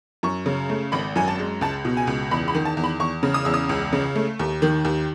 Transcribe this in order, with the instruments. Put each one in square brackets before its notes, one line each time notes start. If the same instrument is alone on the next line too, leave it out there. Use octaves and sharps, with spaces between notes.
[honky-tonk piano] F#2 C#6
C#3
A3
G#1 B5
F#2 G#5
A5
G#3
C#2 A5
B2
G#5
C#2
E2 B5
B5
D#3
A5
E2
B5
E2 C#6
C#3
D#6
E2 E6
D#6
C#2
C#3
A3
D#2
D#3
D#2